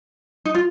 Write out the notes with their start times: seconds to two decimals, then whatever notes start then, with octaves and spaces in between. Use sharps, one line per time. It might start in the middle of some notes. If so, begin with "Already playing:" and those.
0.45 D#4
0.55 F4